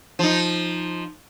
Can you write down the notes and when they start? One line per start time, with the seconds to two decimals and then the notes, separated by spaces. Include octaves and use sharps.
0.19 F3 D#4